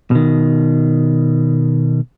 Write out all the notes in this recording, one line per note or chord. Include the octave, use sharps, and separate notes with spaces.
B2 D#3